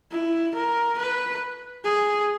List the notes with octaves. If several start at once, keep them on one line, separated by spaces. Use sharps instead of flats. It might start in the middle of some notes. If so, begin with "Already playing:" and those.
E4
A#4
B4
G#4